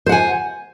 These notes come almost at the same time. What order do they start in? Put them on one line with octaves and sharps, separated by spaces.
C5 F#5 G#5